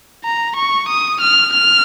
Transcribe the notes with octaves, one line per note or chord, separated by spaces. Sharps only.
A#5
C#6
D#6
F6
F6